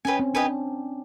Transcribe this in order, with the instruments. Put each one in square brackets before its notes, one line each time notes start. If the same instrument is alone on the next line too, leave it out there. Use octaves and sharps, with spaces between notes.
[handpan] C#4 [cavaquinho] G4 B4 D#5 G#5
[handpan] C4
[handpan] D4 [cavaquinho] G4 B4 D#5 G#5